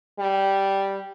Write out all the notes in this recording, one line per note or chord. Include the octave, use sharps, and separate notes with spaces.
G3